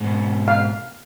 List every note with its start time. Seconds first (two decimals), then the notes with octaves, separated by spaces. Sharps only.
0.01 G#2 B2
0.48 F5